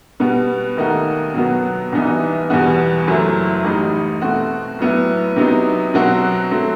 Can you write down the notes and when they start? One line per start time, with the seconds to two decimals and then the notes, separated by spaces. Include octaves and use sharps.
0.20 B2 G3 B3 F#4
0.77 D#2 D#3 A3 D#4 F#4
1.34 B2 F#3 B3 F#4
1.92 C2 C3 E3 B3 D#4
2.50 E2 B2 G3 B3 F#4
3.07 F#1 F#2 F#3 A3 E4
3.64 A1 A2 G3 D#4
4.21 B2 A3 C4 F#4
4.79 B1 A2 F#3 B3 E4
5.36 C3 F#3 B3 D#4
5.94 B2 F#3 C4 F#4
6.51 F#3 A3 C4